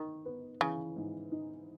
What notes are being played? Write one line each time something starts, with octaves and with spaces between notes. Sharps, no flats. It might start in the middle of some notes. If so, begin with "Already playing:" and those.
Already playing: D#3 D#4
B3
C#3 E3
G#2
D#4